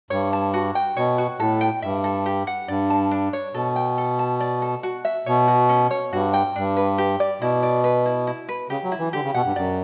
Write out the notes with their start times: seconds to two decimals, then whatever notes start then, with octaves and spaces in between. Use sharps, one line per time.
0.10 G2 C#5
0.33 A5
0.54 F#4
0.75 G5
0.97 B2 C#5
1.18 F#4
1.40 A2 A4
1.61 G5
1.82 G2 E5
2.04 A4
2.26 G4
2.47 F#5
2.68 G2 D5
2.90 A5
3.11 D4
3.33 C#5
3.54 B2 A4
3.76 G5
3.98 A4
4.19 A5
4.40 D5
4.62 A4
4.83 F#4
5.05 E5
5.26 B2 C#5
5.48 F#4
5.69 C#4
5.91 C#5
6.12 G2 F#4
6.34 G5
6.56 G2 D4
6.77 B4
6.98 G4
7.20 D5
7.41 B2 E4
7.63 D5
7.84 B4
8.06 E4
8.27 E4
8.49 B4
8.70 C#3 G4
8.84 F#3
8.92 E4
8.99 E3
9.13 D3 G4
9.23 C#3
9.34 B2 F#5
9.45 G2
9.55 F#2 D5